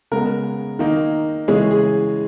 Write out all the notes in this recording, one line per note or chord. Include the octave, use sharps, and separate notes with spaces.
C#3 G#3 B3 A#4
D#3 A#3 D#4
C#3 E3 G#3 C#4 G#4
G#4